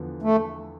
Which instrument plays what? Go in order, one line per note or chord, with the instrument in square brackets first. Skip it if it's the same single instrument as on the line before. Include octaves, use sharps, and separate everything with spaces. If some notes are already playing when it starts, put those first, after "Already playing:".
Already playing: [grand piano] E2 D3 F3 B3
[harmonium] A3